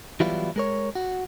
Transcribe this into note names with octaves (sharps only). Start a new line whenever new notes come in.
E3 F#3 G3 B3 E4 F4
G#3 A#4 C#5
F#4